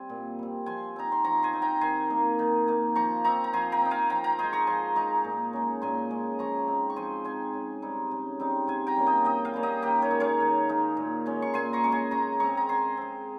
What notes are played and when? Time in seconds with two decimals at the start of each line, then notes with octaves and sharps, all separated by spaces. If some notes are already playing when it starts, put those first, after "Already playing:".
Already playing: G3 C4 G#5
0.09 A#2
0.39 G3 C4
0.66 F3 G#5 C6
0.96 C4 D#4 A#5
1.12 C6
1.24 F3 A#5 C#6
1.43 G#5 C6
1.53 C4 D#4
1.62 G5 A#5
1.81 D#3 G#5 C6
2.10 A#3 D#4
2.39 D#3
2.68 A#3 D#4
2.95 F3 A#5 C#6
3.24 C4 D#4 A#5 C#6
3.44 A#5
3.53 F3 G#5 C6
3.72 G5 A#5
3.81 C4 D#4
3.91 F5 G#5
4.10 F3 G5 A#5
4.24 G5 A#5
4.38 G#3 D#4 G#5 C6
4.53 A#5 C#6
4.67 F3 G#5 C6
4.96 G#3 D#4 A#5 C#6
5.24 A#2
5.53 G#3 C#4
5.82 A#2 G#5 C6
6.10 G#3 C#4
6.39 F3 A#5 C#6
6.67 C4 D#4
6.90 C#6
6.96 F3 G#5 C6
7.25 C4 D#4 G#5 C6
7.54 C#3
7.82 G3 C4 D#4
8.11 C#3
8.40 G3 C4 D#4
8.68 C3 G#5 C6
8.87 G5 A#5
8.96 G3 A#3 C#4
9.07 D#5 G5
9.25 C3 D#5 G5
9.45 F5 G#5
9.54 G3 A#3 C#4
9.63 D#5 G5
9.82 D#3 G4 A#4
10.02 A#4 C#5
10.11 G#3 D#4
10.20 C#5 F5
10.40 D#3
10.69 G#3 D#4
10.97 A#2
11.26 G#3 C#4
11.42 C#6
11.54 A#2 G#5 C6
11.73 A#5 C#6
11.83 G#3 C#4 C#6
11.92 G#5 C6
12.11 C#3 A#5 C#6
12.40 G#3 C4 A#5 C#6
12.57 A#5
12.69 C#3 G#5 C6
12.97 G#3 C4